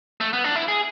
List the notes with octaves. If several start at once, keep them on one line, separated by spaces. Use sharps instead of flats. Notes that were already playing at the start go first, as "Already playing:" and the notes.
A3
B3
D4
E4
G#4